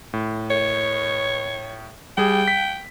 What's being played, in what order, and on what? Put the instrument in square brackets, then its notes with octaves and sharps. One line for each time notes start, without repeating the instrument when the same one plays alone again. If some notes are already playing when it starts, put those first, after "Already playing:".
[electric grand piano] A2
[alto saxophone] C#5
[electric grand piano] G3 G#4 [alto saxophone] G5
[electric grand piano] B6